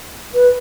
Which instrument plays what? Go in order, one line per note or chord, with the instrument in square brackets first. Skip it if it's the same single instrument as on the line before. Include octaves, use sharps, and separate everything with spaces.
[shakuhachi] B4